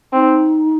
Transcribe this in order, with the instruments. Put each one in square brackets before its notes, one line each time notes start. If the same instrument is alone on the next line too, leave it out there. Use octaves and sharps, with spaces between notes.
[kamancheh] C4 [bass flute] D#4